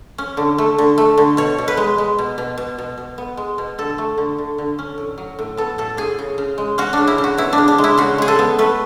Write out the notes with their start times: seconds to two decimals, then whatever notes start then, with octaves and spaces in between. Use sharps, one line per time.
0.18 C#4
0.37 D3
0.58 A3
0.78 D3
0.98 A3
1.18 D3
1.37 B2 C#5
1.58 B2
1.68 B4
1.77 G#3
1.98 G#3
2.18 B2
2.38 B2
2.58 B2
2.79 B2
2.98 B2
3.18 B3
3.37 G#3
3.58 B2
3.78 D3 A4
3.98 A3
4.18 D3
4.38 D3
4.58 D3
4.79 C#4
4.98 A2
5.18 F#3
5.39 A2
5.57 B3 A4
5.78 A2 A4
5.97 A2 G#4
6.19 C#3
6.38 C#3
6.58 G#3
6.78 C#4 F#4
6.93 C#3 D4
7.07 E4
7.18 C#3
7.24 F#4
7.38 B3 E4
7.53 D4
7.58 C#3
7.68 D4
7.78 G#3
7.84 E4
7.98 C#3 F#4
8.18 G#3 G#4
8.28 A4
8.39 B3
8.59 A3 B4